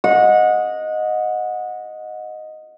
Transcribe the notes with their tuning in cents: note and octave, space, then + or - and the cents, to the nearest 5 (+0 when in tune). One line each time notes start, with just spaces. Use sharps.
D#5 +0 F#5 -25